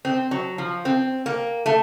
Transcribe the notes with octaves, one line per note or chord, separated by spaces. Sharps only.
C4
F#3
F3
C4
A#3
A3